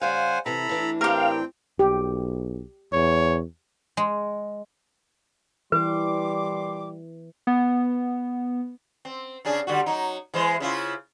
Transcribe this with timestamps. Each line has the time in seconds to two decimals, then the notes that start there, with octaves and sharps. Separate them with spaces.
0.01 C#3 G3 C5 F5 F#5 G#5
0.46 C3 E3 A4 A#5 B5
0.69 A2 E3 D4
1.01 C4 G4 A#4 F5 G5
1.79 B1 G4
2.93 E2 C#5
3.97 G#3
5.72 A#2 E3 G3 B4 C6 D6
7.47 B3
9.05 C4
9.45 C#3 D4 G#4
9.67 D3 G3 F#4
9.86 F#3 D#4
10.34 E3 G#3 C5
10.60 C#3 E4 F4